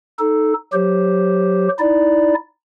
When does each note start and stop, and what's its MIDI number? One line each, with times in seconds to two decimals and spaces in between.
0.19 0.54 63
0.19 0.54 69
0.73 1.68 54
0.73 1.68 67
0.73 1.68 72
1.79 2.34 63
1.79 2.34 64
1.79 2.34 74